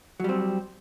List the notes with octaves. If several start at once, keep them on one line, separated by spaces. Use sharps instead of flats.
F#3 G3 C4